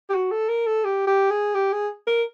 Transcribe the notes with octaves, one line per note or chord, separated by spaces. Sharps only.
G4
F#4
A4
A#4
A4
G4
G4
G#4
G4
G#4
A#4